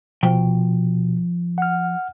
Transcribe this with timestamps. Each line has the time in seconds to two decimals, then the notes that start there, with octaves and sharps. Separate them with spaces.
0.23 B2 F3 G5
1.58 F#5 F6